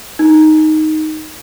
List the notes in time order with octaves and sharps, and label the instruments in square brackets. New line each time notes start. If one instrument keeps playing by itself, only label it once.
[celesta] D#4